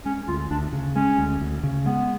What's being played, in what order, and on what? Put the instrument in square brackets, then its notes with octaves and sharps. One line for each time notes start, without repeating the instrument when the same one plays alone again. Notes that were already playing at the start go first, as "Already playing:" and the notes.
[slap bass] G#3 [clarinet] C#4
[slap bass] D2 [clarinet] F4
[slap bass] D2 [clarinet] D4
[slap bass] C#3
[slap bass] G#3 [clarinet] C#4
[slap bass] D2
D2
C#3
[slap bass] G#3 [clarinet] B3